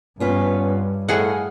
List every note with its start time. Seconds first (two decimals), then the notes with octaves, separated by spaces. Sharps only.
0.20 G2 B3 C#4 F4 B4
1.08 A2 G#4 D#5 F5 F#5 G#5